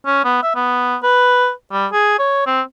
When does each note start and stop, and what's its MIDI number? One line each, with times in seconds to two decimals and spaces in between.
0.06 0.23 61
0.24 0.42 59
0.43 0.54 76
0.55 0.96 59
1.03 1.51 71
1.72 1.86 55
1.92 2.16 68
2.19 2.42 73
2.47 2.61 60